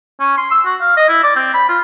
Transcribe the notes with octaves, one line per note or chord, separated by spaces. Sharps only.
C#4
C6
E6
F#4
F5
D#5
E4
D5
C4
B5
F4